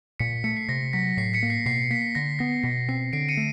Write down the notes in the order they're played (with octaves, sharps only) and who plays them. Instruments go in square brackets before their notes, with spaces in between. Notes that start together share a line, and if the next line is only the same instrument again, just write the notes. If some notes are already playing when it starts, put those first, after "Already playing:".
[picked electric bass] A#2 [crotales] B6 C#7
[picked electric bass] A3 [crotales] B6 C#7
[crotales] C7
[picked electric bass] C3 [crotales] A#6
[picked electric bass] F#3 [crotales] B6
[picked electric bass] A2 [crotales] C7
[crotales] B6 C#7
[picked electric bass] A#3
[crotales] C7
[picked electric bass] B2 [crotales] C7
[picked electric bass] A#3 [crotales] B6
[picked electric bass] D3 [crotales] A#6
[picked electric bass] B3 [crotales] A#6
[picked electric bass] B2 [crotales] B6
[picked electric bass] C4 [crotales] C7
[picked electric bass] D3 [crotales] C7 D7
[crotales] C#7 D#7
[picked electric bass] A3